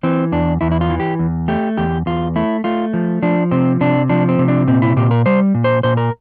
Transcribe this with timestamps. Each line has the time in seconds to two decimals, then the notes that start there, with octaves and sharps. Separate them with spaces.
0.03 E3 C4
0.32 E2 D4
0.61 E2 E4
0.71 E4
0.81 F4
0.90 E3
1.00 G4
1.19 E2
1.48 A3 G4
1.77 E2 G4
2.06 E2 F4
2.36 A3 E4
2.64 A3 F4
2.93 F3
3.22 F3 D4
3.51 C3 C4
3.81 C3 D4
4.09 F3 D4
4.29 C4
4.39 C3
4.48 D4
4.67 A#2 C4
4.82 E4
4.96 A#2 G4
5.11 A#4
5.26 G3 C5
5.54 A#2
5.64 C5
5.83 A#2 C5
5.97 A#4